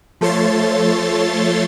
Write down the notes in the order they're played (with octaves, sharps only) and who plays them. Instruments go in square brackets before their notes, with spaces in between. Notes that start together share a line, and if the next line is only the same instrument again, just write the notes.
[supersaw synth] F3 A3 A4 C#5 C6 A6